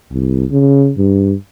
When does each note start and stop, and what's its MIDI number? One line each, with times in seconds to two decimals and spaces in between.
0.11 0.45 36
0.51 0.92 49
0.98 1.35 43